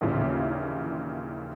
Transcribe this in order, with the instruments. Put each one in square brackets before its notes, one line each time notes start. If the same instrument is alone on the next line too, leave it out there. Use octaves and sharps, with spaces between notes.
[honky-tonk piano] A#1 D#2 A#2 C#3 E3